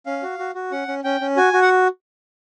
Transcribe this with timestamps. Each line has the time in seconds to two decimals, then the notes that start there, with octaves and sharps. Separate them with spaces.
0.06 C#4 F5
0.23 F#4
0.39 F#4
0.55 F#4
0.71 C#4 F#5
0.88 C#4
1.04 C#4 G5
1.21 C#4
1.37 F#4 G#5
1.53 F#4
1.62 F#5